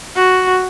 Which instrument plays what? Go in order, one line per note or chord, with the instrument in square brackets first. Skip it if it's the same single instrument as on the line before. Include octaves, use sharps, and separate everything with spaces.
[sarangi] F#4